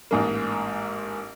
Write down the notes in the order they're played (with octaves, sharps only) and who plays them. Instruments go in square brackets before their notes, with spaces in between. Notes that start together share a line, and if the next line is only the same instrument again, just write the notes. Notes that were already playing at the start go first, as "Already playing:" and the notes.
[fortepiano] A1 G#2 A#3